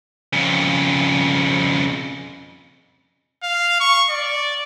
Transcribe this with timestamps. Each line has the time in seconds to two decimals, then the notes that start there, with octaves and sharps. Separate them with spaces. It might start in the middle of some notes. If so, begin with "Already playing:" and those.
0.33 F2 C#3
3.43 F5
3.80 C#6
4.10 D5